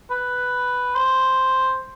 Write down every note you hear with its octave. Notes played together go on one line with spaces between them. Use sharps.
B4
C5